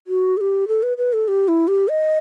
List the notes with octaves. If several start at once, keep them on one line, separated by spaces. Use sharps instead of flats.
F#4
A4
G4
A4
B4
B4
A4
G4
E4
G4
D#5